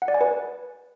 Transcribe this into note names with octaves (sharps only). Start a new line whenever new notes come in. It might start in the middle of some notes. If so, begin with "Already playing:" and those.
F#5
D5
G#5
B4